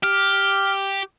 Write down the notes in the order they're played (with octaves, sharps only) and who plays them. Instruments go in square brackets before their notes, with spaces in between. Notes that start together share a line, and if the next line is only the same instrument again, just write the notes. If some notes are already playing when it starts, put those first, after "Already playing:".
[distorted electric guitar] G4 [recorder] F6